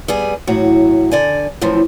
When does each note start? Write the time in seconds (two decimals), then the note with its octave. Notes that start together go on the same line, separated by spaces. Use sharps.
0.08 G3 B3 G#4
0.47 A2 E3 F#3 F#4
1.11 D3 D5 G#5
1.61 F#2 A2 E3 F3